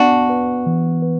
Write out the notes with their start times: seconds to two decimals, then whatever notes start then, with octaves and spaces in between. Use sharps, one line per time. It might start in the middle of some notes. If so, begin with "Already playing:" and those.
Already playing: B3 D4 F#4
0.30 B4
0.66 E3
1.02 B4